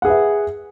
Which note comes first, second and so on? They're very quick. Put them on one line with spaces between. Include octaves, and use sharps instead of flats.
F#5 G#4 B4 E5